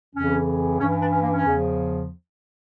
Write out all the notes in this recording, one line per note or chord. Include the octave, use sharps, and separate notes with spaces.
F2 C#3 E3 C#4
G2 E3 C#4
C#4
D4
C#4
A#3
C#4
E2 C#3 F3